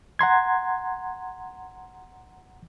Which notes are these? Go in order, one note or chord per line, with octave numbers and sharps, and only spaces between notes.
F#5 A#5 C6 G#6